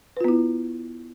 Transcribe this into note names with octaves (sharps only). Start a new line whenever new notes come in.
B3 E4 F4 B4